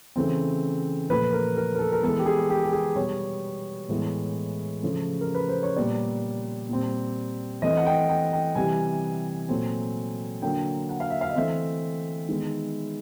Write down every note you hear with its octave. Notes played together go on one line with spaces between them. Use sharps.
C#3 E3 A3 C4
A#2 F3 A3 B4
A#4
A#4
A#4
A4
A#4
E3 G#3 B3 A4
G4
G#4
G4
G4
G#4
B2 G3 B3 C#5
A2 E3 G#3 B3
C#3 F3 A3
A#4
B4
C5
C#5
A#2 G3 B3 D5
A#2 G3 C4
E3 A3 C4 D#5
F#5
G5
G5
G5
C3 E3 G3 G#5
A#2 F#3 A3 C4
D3 F#3 A#3 G5
F#5
F5
E5
F5
D#5
E3 A3 C4 E5
D#3 G#3 B3